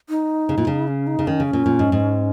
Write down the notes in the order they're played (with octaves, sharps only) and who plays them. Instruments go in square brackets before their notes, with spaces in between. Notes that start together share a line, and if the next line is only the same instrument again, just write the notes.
[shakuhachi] D#4
[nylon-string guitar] C#3
A#2
C#3
[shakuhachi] C#4
D#4
[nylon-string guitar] C#3
[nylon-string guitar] D#3 [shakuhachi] C#4
[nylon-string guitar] C#3
A#2
A#2
G#2
G#2